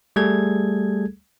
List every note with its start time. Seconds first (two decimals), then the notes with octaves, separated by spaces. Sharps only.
0.16 G3 A3 G#4 A4 G#6